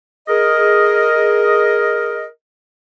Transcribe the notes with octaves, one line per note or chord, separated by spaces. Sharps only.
G#4 A#4 D#5